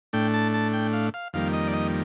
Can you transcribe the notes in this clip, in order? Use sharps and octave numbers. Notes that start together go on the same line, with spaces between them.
A2 A3 D4 G5
A5
A5
G5
F5
F5
F2 D#3 G3 A#3 F5
D#5
D5
D#5